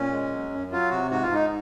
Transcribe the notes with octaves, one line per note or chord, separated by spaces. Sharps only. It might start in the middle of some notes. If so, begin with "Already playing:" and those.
Already playing: A#2 C#4
G#3
F#3
F#2
F#3 F4
C3 F#4
G#2 F#4
F4
G#2 D#4